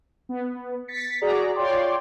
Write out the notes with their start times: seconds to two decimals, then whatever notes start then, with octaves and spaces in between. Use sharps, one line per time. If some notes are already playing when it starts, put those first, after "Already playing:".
0.29 B3
0.88 A6 B6 C#7
1.21 F#4 G#4 D5 A#5
1.55 F4 C#5 D5 G5 C6 D6